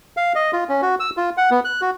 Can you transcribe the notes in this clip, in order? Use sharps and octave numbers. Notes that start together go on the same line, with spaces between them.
F5
D#5
F4
C#4
F#4
E6
F4
F#5
B3
F#6
F#4